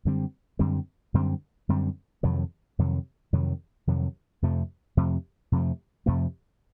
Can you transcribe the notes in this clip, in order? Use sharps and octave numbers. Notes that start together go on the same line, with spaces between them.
F#2 D3 G3 C4
F#2 D3 G3 C4
F#2 D3 G3 C4
F#2 D3 G3 C4
F2 C3 D#3 F#3
F2 C3 D#3 F#3
F2 C3 D#3 F#3
F2 C3 D#3 F#3
F2 C3 F3 A3
F2 C3 F3 A3
F2 C3 F3 A3
F2 C3 F3 A3